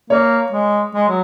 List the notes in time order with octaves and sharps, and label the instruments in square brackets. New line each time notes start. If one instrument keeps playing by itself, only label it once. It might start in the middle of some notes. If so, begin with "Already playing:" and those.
[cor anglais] A#3 [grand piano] C#5
[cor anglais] G#3
G#3
F#3